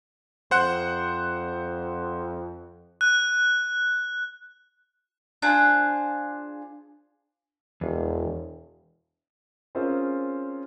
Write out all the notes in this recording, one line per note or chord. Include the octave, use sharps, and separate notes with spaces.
F2 C5 F#5 F#6
F#6
D4 F4 G#4 C5
E1 E2
C4 C#4 F4 G#4 A#4 C5